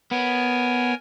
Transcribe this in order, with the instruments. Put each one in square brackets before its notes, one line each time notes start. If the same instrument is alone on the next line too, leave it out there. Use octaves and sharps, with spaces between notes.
[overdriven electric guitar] B3 [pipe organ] A#4 C#5 G#5